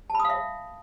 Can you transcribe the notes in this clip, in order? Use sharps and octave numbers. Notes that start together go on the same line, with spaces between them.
A5
B5
D#6
F5
E5